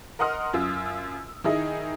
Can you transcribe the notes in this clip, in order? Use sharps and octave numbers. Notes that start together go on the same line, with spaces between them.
A#4 D#5 F#5 C6 D#6 F6
F#2 F4 E6
D#3 D#4 E4 G#4 D#5